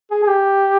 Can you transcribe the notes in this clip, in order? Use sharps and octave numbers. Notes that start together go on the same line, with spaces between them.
G#4
G#4
G4